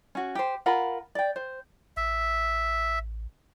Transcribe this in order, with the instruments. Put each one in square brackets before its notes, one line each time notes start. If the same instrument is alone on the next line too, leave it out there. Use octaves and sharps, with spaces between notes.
[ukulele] C#4 F#4
G4 C5
F4 A#4 F#5 B5
D5 G5
C5
[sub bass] A1 [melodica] E5